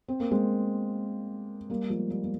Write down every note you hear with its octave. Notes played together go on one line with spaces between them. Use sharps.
C4
A#3
G#3 C4
G3 A#3
F3 G#3
G3 A#3
A#3